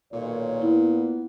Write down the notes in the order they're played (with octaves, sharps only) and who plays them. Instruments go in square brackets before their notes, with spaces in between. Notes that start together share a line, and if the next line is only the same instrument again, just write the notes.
[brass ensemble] B1 D#3 C#5 [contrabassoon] A#2
[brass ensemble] B3 [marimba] E4